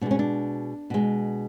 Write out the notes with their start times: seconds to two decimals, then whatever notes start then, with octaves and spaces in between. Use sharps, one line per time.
0.01 B2 D4
0.06 G#3
0.11 C#4
0.19 D4
0.90 B2 G#3